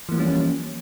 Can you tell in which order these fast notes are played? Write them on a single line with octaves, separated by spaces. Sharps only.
E3 A#3 F3 G3 C#4